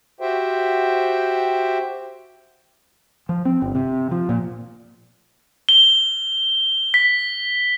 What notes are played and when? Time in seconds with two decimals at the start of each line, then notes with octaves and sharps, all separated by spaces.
0.20 F#4 G4 C5 E5 G5
3.29 F3
3.45 C4
3.62 G1
3.75 C3
4.11 F3
4.29 A#2
5.69 G7
6.94 B6